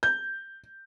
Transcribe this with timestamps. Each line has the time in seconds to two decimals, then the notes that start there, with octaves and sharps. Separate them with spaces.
0.03 G6